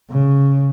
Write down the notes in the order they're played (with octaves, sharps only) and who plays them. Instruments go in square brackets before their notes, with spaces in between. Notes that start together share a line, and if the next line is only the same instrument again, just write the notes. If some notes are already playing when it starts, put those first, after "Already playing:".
[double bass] C#3